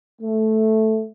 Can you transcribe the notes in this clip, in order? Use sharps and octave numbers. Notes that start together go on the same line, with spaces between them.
A3